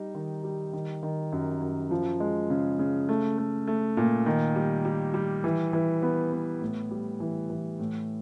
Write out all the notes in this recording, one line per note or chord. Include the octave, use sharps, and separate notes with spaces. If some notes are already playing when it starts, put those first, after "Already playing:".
Already playing: G3 D#4
D#3
G3
D#3
D#3
F#2
F#2
F3
G#3
C#3
C#3
A3
A3
A3
A#2
D#3
G3
G3
G3
E3
E3
B3
B3
A2
G3
E3
E3
A2